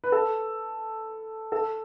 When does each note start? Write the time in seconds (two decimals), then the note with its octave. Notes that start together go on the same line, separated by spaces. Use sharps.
0.04 B4
0.12 A4
1.52 A4